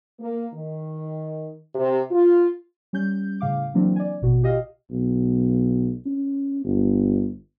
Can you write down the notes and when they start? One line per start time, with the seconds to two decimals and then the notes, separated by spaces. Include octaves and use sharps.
0.20 A#3
0.54 D#3
1.75 C3
2.11 F4
2.93 G3 C#4 G6
3.40 A2 C#3 F5 D6
3.74 E3 F#3 A#3 C4 D4
3.96 D5 G#5
4.22 A1 B2 F#4
4.43 F4 G4 D#5 F5
4.90 B1
6.06 C#4
6.64 G1